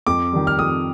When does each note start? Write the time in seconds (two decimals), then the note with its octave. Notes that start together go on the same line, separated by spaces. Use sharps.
0.07 F2 D6
0.32 D#3 G3
0.47 F6
0.59 F2 D#6